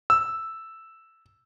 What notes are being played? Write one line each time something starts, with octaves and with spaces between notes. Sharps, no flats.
E6